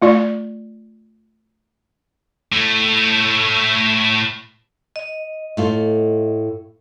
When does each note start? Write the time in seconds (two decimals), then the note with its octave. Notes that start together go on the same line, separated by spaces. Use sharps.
0.02 A3 F4 D5
2.52 A2 A3
4.96 D#5
5.57 A2 A3 F4